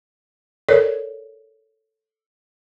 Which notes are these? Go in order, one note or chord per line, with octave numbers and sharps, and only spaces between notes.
A4 A#4 C#5 D5